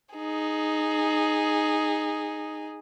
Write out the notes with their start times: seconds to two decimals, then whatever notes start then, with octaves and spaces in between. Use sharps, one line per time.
0.15 D#4 G#4